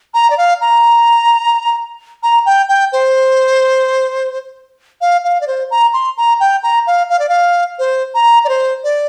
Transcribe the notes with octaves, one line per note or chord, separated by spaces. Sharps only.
A#5
D5
F5
A#5
A#5
G5
G5
C5
F5
F5
D5
C5
A#5
C6
A#5
G5
A#5
F5
F5
D5
F5
C5
A#5
D5
C5
D5